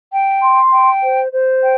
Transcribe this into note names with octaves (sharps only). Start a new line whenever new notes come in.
G5
C6
G5
C5
C5
G5